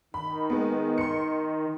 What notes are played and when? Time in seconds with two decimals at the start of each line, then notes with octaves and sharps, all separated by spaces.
0.14 D#3 B5
0.50 G#3 B3
0.98 C6 C#7